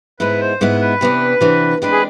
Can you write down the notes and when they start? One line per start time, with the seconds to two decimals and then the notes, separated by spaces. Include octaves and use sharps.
0.20 G#2 G#3 B3 E4 B4
0.41 C5
0.61 G#2 G#3 B3 E4 B4
0.81 B4
1.01 C3 E3 B3 D4
1.41 C3 E3 B3 D4
1.82 C3 G#3 D4 B4
1.92 G#4